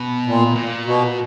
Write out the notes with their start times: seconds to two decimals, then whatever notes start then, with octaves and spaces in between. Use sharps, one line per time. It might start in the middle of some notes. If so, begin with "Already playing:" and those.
Already playing: B2
0.26 A#2
0.55 A#2
0.85 B2